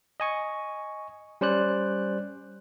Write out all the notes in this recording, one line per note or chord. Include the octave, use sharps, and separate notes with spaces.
D#5 G#5 C#6
G3 C#4 C5 D5 F#6